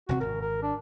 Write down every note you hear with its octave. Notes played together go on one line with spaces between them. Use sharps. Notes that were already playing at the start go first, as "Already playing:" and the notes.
E1 C3 C4 F#4
G#1 A#4
A#4
D4